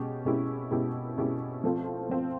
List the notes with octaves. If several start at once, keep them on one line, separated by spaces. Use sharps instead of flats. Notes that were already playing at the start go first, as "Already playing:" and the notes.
Already playing: B2 G#3 C#4 G4
B2 G#3 C#4 E4 G4
B2 G#3 C#4 E4 G4
B2 G#3 C#4 E4 G4
F3 A3 C4 F4
F3 A3 C4 F4